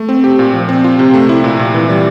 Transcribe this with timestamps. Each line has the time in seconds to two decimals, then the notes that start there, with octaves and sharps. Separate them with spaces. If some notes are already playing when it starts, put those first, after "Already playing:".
Already playing: A3
0.09 C4
0.24 G4
0.39 A#2
0.54 F3
0.69 C4
0.84 F4
0.99 C3
1.14 A3
1.29 E4
1.44 A#2
1.59 A#2
1.74 E3
1.89 G3